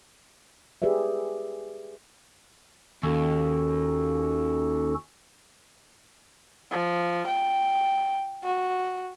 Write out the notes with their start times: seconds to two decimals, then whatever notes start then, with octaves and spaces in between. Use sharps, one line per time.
0.82 G4 G#4 B4 D5 E5
3.03 D#2 C#4 F#4 A4
6.71 F3
7.27 G5
8.43 F#4